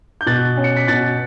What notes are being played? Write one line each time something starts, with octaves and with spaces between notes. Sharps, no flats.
G6
B2 F#6 A6
C#4
C#7
B6
B2 F#6 A6